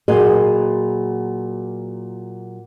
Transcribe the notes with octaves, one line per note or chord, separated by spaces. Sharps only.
A#2 F#3 G#4 B4 D#5